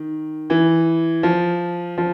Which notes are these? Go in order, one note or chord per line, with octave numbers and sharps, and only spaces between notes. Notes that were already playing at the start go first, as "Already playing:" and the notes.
Already playing: D#3
E3
F3
F3